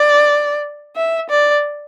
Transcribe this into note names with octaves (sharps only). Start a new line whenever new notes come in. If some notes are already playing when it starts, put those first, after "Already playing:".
Already playing: D5
E5
D5